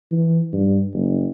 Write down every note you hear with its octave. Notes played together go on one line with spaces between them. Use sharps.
E3
G2
F#1